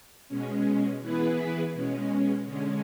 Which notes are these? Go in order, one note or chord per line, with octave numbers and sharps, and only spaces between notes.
B2 G#3 C#4
E3 B3 E4 G#4 B4
B2 G#3 C#4
D3 G#3 C#4